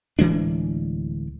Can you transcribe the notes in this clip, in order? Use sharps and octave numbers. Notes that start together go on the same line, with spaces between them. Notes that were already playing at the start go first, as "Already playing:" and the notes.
D1 E3 G#3 D4